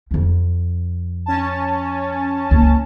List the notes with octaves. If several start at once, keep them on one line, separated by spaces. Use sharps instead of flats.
F2 F3
C#4 A5
C#2 A#3